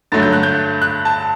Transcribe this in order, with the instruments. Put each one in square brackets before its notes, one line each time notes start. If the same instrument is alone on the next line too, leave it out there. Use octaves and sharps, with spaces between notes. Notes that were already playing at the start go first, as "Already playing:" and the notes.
[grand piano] G2 D3 F#3 A3 A6
G6
F#6
G6
F#6
A5